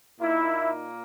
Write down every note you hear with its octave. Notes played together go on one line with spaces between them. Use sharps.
A#2 A#3 D#4 E4